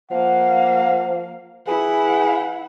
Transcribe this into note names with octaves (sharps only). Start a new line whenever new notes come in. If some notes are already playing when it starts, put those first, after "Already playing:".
F3 A#3 F5 F#5
E4 G#4 B4 F#5